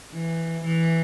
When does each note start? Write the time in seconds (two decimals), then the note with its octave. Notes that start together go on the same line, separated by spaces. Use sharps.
0.12 E3
0.64 E3